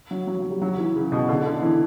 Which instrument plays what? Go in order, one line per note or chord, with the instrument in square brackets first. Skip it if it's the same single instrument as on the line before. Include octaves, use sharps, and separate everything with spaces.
[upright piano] F#3
F#3
F#3
G3
F#3
E3
C#3
B2
D3
D3
E3